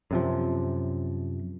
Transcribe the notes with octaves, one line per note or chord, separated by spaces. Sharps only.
F#2 C3 F3